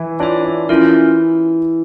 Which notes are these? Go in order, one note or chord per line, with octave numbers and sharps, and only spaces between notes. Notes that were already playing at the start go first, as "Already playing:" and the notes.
Already playing: E3 E4
D4 F4 C#5 E5
D4
E3 C#4 E4 F4 A#4